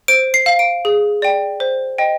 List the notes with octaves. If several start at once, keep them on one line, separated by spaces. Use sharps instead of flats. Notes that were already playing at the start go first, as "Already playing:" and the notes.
C5 D7
C7
F5
D7
G#4
D5 G5
C5
D#5 G5